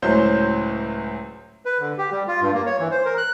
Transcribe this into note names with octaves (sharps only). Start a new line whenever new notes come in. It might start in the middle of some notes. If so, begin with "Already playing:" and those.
C#2 A2 F#3 C#4 C5 G6
B4
D3
G4
G3
F4
G2
A#3
C#5
E3
C5
A#4
F#6